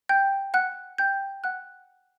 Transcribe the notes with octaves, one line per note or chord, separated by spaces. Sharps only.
G5 G6
F#5 F#6
G5 G6
F#5 F#6